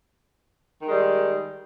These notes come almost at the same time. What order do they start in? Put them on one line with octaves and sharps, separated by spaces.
D#3 G#3 G3